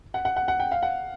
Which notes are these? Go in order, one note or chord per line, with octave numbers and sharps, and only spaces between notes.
F#5
F#5
F#5
F#5
G5
F5
F#5